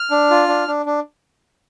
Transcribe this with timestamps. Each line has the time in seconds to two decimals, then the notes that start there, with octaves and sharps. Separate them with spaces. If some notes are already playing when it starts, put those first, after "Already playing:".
Already playing: F6
0.11 D4
0.31 F4
0.48 D4
0.68 D4
0.86 D4